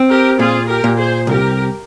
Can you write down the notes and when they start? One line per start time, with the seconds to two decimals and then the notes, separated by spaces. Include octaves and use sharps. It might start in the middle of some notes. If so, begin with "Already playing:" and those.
Already playing: C4
0.09 G4 A#4
0.39 A#2 F4 G#4
0.68 G4 A#4
0.84 A#2
0.97 G#4 C5
1.27 C2 G4 A#4